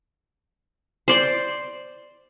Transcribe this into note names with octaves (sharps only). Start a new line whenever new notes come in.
C5 D5 C6